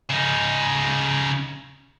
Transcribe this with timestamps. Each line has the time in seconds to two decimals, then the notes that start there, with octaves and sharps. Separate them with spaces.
0.10 C#3 D#4